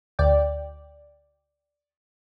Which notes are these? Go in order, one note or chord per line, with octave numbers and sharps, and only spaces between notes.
D2 D5 G5